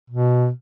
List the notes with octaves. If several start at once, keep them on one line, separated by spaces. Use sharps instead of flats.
B2